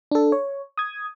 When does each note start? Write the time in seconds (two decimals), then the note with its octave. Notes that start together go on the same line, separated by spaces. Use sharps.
0.12 D4 A4
0.32 C#5
0.78 D#6 G#6